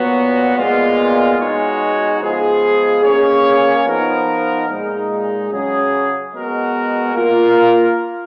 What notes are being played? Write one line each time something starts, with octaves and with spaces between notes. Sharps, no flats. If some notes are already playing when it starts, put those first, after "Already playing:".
Already playing: A#2 F#3 B3 F#4
A#2 G#3 B3 F4
B2 G#3 D#4 F#4 C#5
F3 G#3 B3 F4 G#4
A#3 C#4 G#4 C#5
F3 B3 D#4 A#4
A#2 G#3 D#4
C#3 F#3 C#4 G#4
B2 G#3 B3 F#4 A#4
A#3 F4 A#4